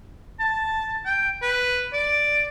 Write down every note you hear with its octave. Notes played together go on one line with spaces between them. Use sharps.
A5
G5
B4
D5